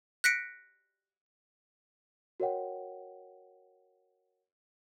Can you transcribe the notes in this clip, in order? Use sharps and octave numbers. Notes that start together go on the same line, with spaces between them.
F#6 A#6 B6 C#7 D7
F#4 A#4 C#5 D#5 F#5 G5